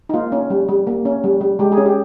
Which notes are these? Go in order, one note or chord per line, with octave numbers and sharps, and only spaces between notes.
D#4
A#3 F4
C#4
G3
G3
A#3
C#4
G3
G3
G#3 G4
G#4
C#4
G4